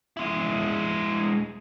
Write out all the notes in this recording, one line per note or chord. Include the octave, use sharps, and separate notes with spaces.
G#3 E4